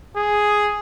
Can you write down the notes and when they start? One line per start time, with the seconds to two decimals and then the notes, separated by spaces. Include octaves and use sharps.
0.17 G#4